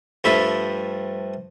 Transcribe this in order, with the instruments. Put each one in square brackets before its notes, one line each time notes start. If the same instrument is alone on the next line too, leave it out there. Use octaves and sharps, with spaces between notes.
[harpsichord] G2 F3 A3 E5 B5